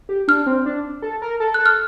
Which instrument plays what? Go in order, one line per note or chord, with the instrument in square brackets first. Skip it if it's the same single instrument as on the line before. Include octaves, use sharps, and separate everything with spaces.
[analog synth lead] G4
[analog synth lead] D4 [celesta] F6
[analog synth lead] C4
D4
A4
A#4
A4
[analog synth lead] A4 [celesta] F#6
[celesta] F6